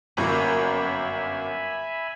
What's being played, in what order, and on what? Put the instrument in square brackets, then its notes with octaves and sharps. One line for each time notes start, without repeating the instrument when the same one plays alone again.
[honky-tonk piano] G1 F#2 A#3 [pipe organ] E5 G#5 B5